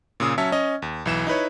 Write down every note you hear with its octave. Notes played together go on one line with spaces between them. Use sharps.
A#2 C#3 D#6 E6
F#3 C#4 C#5 E5 A5
C#4 D#5
D#2
B1 E3 E7
D#4 E4 B4 C#5